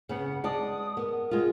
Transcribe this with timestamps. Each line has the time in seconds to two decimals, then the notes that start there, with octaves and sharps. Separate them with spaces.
0.09 C#3 B3 F#5
0.44 G#3 D5 A5 D#6
0.97 B3 A#4
1.31 G#3 F4